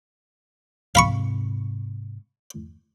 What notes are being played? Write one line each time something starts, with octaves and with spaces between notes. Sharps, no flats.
G#2 C3 F5 B5 C#6